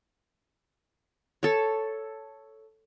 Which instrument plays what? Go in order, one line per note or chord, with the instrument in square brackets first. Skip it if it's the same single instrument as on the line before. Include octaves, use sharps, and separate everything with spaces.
[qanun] A4 C#5